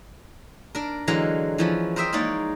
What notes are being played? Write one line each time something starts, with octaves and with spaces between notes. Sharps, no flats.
D4 A#4
D3 E3 F#3 G#3 F5 A#5
E3 F3 C#4
A#4 C5 D#5 E5 G5
G#3 A#3 D#4 C#5 D5